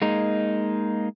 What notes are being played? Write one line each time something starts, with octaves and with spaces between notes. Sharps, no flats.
G#3 A#3 D#4